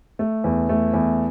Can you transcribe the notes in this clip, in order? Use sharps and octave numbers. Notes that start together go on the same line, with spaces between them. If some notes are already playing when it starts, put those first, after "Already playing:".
A3
E2
A3
E2